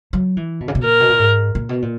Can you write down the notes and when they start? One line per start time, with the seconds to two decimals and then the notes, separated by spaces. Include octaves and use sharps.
0.13 F#3
0.37 E3
0.60 B2
0.68 C#3
0.75 B2
0.84 A#2 A#4
1.00 B2
1.09 A#2
1.19 G#2
1.55 A#2
1.69 B2
1.82 A#2